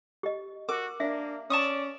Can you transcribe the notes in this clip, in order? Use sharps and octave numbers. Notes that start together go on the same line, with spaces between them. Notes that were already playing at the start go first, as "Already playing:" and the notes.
G4 D#5
F#4 A#4 D6
A#3 D4 E5
C#4 D5 A5 C#6 D#6